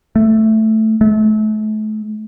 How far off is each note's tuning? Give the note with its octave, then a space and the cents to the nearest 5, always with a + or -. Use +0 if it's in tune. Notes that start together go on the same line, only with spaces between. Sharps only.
A3 +0
A3 -35